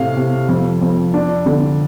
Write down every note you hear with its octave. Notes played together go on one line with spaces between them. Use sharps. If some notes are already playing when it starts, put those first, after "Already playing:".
Already playing: A2 C3 F5
C3
F2
F2
D4
D3